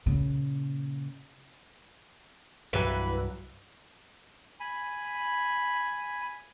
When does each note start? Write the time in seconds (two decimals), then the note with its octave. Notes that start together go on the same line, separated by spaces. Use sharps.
0.06 A#2 C#3
2.73 C2 G2 E3 F#3 B4
4.60 G#5 B5